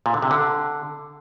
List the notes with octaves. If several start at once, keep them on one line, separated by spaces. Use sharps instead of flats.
A#2
D3
C3
D3